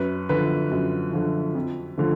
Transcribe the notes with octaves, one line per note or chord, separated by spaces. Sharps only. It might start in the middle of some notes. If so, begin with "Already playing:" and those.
Already playing: F#2 B4
D3 F3 B4
F#2
D3 F3
F2
D3 F3 A3